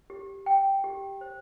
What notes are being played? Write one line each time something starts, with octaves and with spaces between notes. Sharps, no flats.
G4
G5
G4
C5